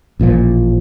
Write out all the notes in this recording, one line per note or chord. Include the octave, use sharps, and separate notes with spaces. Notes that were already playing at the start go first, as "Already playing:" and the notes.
A1 A#2 D3 F3